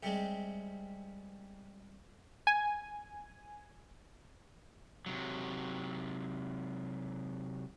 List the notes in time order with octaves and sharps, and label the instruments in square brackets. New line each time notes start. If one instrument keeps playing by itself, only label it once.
[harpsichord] C3 G3 G#3
[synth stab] G#5
[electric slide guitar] C3 F#3